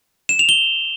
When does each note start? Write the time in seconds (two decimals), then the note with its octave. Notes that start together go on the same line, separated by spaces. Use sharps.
0.29 E7
0.39 F7
0.49 G7